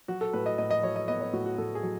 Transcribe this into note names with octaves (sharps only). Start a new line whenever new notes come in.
F#3 F#4
A4
A2 B4
D#5
A2 D#5
D#5
F#3 C#5
D#5
B3 D#5
C#5
A2 F#4
F#4
A2 A4
G#4
F#3